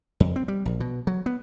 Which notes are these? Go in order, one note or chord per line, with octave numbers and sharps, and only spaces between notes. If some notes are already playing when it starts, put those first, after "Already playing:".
F2
C4
G3
A#1
B2
F#3
B3